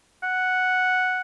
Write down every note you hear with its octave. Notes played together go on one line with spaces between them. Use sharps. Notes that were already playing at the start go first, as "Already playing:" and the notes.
F#5